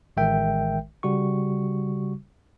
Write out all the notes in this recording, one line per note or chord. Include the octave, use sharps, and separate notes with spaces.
A1 D#3 G#3 A#4 E5 G5
C#3 G3 F#4 C#6